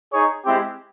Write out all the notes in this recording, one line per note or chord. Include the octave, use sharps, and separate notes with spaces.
D#4 G#4 C#5
G#3 C4 E4 G4